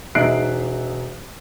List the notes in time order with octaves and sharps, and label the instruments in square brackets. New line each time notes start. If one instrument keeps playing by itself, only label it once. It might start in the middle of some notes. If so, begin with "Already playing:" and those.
[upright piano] E1 D#4 E5 F#6 C7 D7